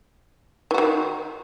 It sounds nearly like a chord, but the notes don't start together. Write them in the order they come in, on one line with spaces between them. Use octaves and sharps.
E3 F#4 D#3